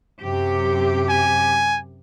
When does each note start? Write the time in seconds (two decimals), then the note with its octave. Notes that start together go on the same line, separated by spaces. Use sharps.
0.21 F#2 C3 G4
1.09 G#5